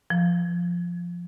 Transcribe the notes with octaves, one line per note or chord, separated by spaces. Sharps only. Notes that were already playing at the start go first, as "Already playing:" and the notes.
F3